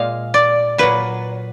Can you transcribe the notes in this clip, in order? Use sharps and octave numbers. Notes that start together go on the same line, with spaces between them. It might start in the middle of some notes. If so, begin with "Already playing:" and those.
Already playing: A#2 G#3 F5
D5
A#2 F#3 B4